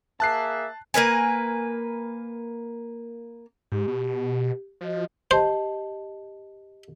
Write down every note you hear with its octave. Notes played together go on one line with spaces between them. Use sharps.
A#3 G#4 E5 A5 F#6 C7
A#3 A#4 B4 G#5
G#2 G4
B2
F3 F#4 D#5
G4 C5 D#5 A5